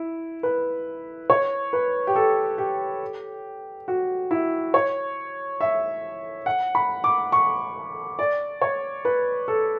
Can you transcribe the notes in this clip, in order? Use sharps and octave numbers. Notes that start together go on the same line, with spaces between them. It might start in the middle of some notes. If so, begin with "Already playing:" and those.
Already playing: E4
B4
C#5
B4
G4
A4
G4
F#4
E4
C#5
E5
F#5
B5
D6
C#6
D5
C#5
B4
A4